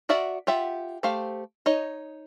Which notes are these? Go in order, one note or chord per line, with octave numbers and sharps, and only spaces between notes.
F#4 A#4 D5 E5 F#5
F4 G4 E5 F#5
A3 G4 C5 F5
D#4 C#5 D#5